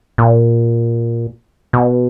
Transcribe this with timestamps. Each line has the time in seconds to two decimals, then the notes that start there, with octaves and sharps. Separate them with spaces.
0.18 A#2
1.73 B2